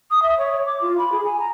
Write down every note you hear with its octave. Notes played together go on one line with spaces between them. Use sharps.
D#6
E5
C#5
C#5
D6
F4
B5
G#4
G#5
A#5